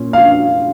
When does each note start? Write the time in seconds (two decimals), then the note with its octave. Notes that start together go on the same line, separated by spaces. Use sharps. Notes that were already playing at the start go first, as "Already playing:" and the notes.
Already playing: A#2 C#4
0.13 F5